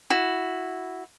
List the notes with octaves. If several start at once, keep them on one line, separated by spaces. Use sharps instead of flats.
E4 F#4